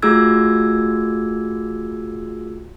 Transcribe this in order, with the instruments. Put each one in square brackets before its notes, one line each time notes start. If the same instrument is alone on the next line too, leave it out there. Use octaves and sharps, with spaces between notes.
[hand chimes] A3 F4 F#4 G#4 E6 G#6